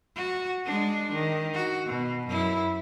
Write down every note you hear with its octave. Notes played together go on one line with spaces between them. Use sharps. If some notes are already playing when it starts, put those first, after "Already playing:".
F#4
G#3 D4
D#3
F#4
B2
F#2 E4